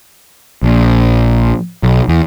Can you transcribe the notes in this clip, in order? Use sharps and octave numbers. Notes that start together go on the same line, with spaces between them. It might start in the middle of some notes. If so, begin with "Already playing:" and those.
A#1
B1
E2